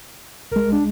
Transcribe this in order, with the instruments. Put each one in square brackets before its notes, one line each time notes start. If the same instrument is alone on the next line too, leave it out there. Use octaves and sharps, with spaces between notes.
[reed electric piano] C2 G#3 [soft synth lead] A#4
[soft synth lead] D4